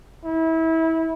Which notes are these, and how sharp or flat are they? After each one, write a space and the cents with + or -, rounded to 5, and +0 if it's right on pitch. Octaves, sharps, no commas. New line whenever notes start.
E4 -25